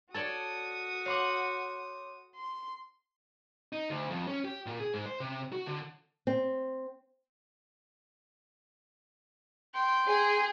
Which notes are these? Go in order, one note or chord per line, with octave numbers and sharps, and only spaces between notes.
F#4 A4 C#5 D5 A5 D#6
C#5 F5 F#5 C6 D6
C6
D#4
D2
F2
C#4
G4
A#2
G#4
G#2
C5
C3
F#4
D3
C4
G5 C6
G#4